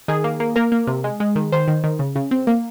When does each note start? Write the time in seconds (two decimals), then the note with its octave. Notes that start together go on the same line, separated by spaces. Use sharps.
0.08 D#3 G#4
0.24 A#3
0.40 A#3
0.56 A#3 A#4
0.72 A#3
0.87 C3
1.04 G#3
1.20 G#3
1.36 D#3
1.52 D#3 C5
1.68 D#3
1.84 D#3
1.99 C#3
2.15 C#3
2.31 C4
2.47 A#3